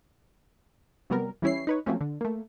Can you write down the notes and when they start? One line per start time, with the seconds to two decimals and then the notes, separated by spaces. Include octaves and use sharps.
1.10 C3 F#3 G3 B3 A#4
1.42 E3 G3 C#4 E4 C#5 C7
1.67 D#4 B4 C#5
1.86 F3 F#3 A3 A#3 C4 C#4
2.01 D3
2.21 A3 A#3